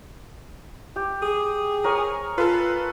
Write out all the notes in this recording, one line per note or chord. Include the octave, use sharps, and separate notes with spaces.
G4
G#4
A#4 C#5 G#5
F4 A4 B4